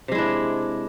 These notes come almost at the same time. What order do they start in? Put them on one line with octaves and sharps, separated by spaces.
C3 G#3 E4 D4